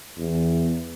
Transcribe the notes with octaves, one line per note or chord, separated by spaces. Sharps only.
E2